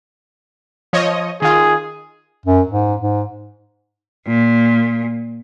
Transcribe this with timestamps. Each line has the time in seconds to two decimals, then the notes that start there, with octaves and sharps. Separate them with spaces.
0.93 F3 C#5 D#5
1.42 D#3 F4 G#4
2.46 F#2
2.68 G#2
3.01 G#2
4.27 A#2